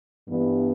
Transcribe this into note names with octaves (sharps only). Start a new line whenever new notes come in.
G2 E3 G3 B3